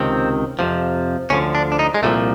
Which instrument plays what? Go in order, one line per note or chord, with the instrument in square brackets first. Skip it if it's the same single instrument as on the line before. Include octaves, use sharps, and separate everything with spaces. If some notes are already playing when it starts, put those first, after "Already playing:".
Already playing: [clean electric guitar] C#2 C3 D#3 C4
F2 C3 F3
D2 D3 F3 C#4
D4
D4
D#4
G#3
C2 A#2 F3 A3